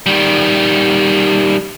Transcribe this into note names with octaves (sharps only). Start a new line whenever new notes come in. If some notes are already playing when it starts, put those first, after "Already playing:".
D#3 G3